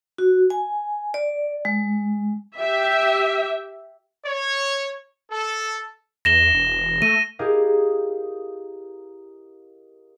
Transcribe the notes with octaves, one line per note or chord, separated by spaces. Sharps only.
F#4
G#5
D5
G#3
G4 E5
C#5
A4
E2 A#6 E7 G7
E1
A3 D#7
E4 G4 G#4 A#4 D#5 F5